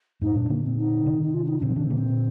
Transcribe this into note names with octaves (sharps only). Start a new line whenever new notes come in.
F2 G#2 D#4
G2 A#2 D4
A#2 D3 A#3
C4
D#4
C3 D#3
D#4
F4
D4
D#4
D4
A#2 D3 C4
F3
C3 D#3 D4
C4
A#2 D3 A#3
C4